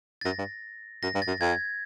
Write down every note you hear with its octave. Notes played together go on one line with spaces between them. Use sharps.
A6
F#2 A#6
G2
F#2 A#6
G2
A6
F#2
F2 G#6